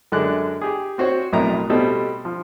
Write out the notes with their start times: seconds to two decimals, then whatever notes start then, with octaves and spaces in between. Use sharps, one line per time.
0.12 F#2 D3 G#3 D4 A#4 F#6
0.61 G4 G#4
0.98 C4 F#4 C5 C#5
1.33 B1 F2 A2 E4 A#4 A#5
1.70 B2 G3 A3 C4 A4
2.25 F3